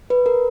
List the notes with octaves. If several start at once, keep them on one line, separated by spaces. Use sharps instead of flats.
B4
A#4